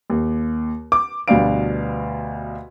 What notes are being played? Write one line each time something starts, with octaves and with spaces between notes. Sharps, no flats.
D#2
D6
D2 B2 G3 D4 F5 D7